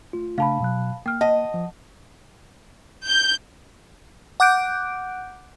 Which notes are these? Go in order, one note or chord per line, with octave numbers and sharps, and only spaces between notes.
A3 F4
C#3 A3 D4 F5 A5 B5
B2 F#3 F#6
A#3 G5 F6
D#5 F#5 A5
F3
G6
F#5 D6 F#6 G6 D7